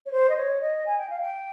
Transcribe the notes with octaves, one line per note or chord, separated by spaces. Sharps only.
C#5
C5
D#5
C#5
D#5
G#5
G5
F5
G5